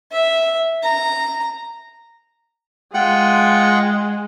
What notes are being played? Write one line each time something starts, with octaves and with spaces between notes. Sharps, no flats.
E5
A#5
G#3 F4 F#5 G5